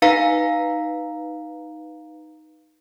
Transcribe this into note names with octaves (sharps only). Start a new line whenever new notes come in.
D#4 B4 F5 A#5 B6